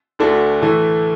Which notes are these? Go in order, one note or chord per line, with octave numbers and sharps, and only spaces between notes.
D2 D3 A3 D4 F#4
A2 E3 A3